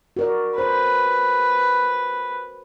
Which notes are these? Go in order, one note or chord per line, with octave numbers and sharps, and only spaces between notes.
F#4 A#4 D5
B4 C5